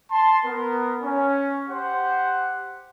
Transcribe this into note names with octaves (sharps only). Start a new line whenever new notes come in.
A5 C6
B3 A#4
C#4
G4 C5 F#5